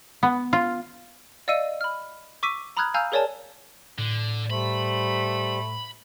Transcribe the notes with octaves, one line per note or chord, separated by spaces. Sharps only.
B3
F4
D5 D#5 F5 E6 C#7 D#7
B5 F6
C#6 D6 E6 B6 D#7
A#5 B5 D#6 F6 F#6 G#6
F5 G#5 A#5 E6 F6 G6
G#4 A#4 C#5 D5 G#5 A5
A2 D3
G3 A3 C5 B5